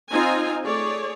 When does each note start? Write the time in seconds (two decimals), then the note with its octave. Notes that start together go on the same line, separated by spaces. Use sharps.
0.11 C4 D#4 F4 G#5
0.64 A3 G#4 C#5 D5